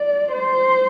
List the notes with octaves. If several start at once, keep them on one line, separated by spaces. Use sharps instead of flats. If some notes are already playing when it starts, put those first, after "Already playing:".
Already playing: D5
C5